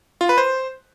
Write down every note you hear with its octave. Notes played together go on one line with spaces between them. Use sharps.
F4
B4
C5